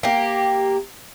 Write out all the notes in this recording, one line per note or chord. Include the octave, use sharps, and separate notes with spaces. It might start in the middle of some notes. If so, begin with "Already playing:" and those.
A#3 G4